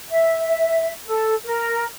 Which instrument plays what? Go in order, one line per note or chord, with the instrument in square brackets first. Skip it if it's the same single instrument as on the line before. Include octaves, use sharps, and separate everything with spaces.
[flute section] E5
A4
A#4